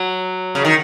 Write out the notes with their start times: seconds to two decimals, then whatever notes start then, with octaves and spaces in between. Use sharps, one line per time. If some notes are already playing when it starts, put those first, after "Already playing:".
Already playing: F#3
0.55 C#3
0.65 D#3